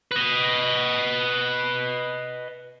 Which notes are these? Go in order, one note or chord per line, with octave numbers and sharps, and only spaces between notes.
B4 D#5